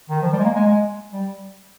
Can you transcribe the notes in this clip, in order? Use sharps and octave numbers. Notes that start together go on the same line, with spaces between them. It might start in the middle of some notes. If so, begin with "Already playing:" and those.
D#3
F3
G3
G#3
A#3
G#3
G#3
G3